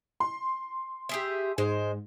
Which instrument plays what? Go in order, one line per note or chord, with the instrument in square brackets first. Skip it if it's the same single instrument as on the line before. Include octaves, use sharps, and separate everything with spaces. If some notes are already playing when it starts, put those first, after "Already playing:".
[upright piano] C6
[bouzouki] G4 G#4 E5
[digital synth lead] G#2 [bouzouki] G#3 C5